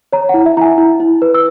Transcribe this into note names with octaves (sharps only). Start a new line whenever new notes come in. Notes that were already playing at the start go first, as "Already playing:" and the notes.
C#5 A#5
F#5
E4
E5
E4 G#5 A#5
E4
E4
B4
E6